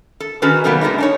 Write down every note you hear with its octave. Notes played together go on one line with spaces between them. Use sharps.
A4
D#3 C#4 F#4 G#4 A4 B4
C3 D#3 F#3 G3 A#3 B3
A#2 D3 E3 G#3 A3 D#4
D4 D#4 C#5